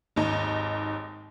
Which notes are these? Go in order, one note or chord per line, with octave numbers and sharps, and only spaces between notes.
G#1 D#2 D#4